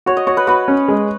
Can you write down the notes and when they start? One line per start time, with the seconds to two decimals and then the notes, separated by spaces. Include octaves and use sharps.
0.06 F#4 C#5
0.17 D#5
0.27 F#4 C#5
0.37 B4
0.47 F#4 B4
0.68 C#4
0.88 G#3